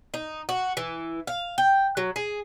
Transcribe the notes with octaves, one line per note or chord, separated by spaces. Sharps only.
D#4
F#4
E3
F5
G5
F#3
G#4